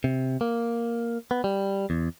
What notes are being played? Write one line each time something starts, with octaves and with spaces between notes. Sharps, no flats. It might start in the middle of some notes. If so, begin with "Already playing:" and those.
C3
A#3
B3
G3
E2